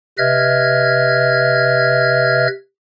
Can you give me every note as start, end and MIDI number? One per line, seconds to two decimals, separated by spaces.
0.18 2.47 48
0.18 2.47 71
0.18 2.47 75
0.18 2.47 76
0.18 2.47 89
0.18 2.47 92